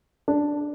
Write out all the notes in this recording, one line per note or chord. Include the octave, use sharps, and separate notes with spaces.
D4